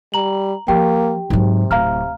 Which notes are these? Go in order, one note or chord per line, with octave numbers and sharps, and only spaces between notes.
G3 A#5 F#7
F3 A#3 G4 G5
G#2 C3 F#3
D1 F5 A#5 F6